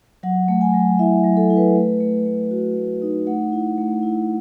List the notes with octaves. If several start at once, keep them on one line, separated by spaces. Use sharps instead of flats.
F#3 F#5
A3
G#5
F#3
E4 E5
F#3
A4
E4
B4
A3
A3
A3
F#4
A3
D#4
A3 F#5
E4
A3
E4